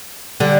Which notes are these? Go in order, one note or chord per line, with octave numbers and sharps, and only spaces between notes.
D3 G3